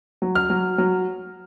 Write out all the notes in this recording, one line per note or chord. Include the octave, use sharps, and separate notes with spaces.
F#3
F6
F#3
F#3